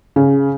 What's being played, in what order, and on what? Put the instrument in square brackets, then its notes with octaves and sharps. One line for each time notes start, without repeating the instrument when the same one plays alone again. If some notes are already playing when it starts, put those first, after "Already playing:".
[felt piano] C#3